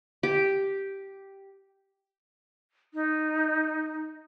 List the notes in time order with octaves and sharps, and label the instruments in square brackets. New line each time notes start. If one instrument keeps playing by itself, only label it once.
[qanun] G4
[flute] D#4